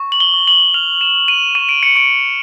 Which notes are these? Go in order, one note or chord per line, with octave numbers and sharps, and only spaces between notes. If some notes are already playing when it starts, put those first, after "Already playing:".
Already playing: C#6
F#7
G7
C#6
F#7
F6 F7
E7
F6
D#7
C#6 D#7
D7
C#7
C#6 D7